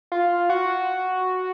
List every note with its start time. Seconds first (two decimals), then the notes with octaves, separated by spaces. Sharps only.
0.12 F4
0.50 F#4